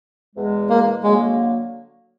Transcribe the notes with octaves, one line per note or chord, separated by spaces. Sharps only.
E2 B2 G#3
A#3
D3 F#3 G#3 A#3